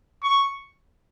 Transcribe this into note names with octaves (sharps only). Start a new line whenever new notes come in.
C#6